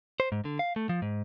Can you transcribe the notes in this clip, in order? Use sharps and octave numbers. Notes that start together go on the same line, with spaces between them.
C5
G#2
D3
F5
A3
F3
G#2